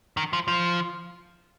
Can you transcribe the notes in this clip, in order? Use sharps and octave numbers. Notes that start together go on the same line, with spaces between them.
D#3
F3
F3